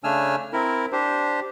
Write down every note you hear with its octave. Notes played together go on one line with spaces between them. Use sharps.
C#3 A3 D4 G#5 E6 F6
C4 E4 A#4
D4 G4 C5